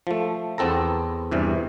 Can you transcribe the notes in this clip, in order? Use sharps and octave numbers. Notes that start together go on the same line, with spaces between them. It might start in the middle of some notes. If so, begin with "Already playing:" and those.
F3 A3
E2 B3 C4 A4 A#5
E2 G2 C3 E3